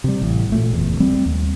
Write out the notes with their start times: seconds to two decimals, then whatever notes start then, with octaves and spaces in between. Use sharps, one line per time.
0.04 C3 G3
0.22 A1
0.52 A#2 A3
0.73 F#1 E2
1.00 G3 A3 C4
1.26 D#2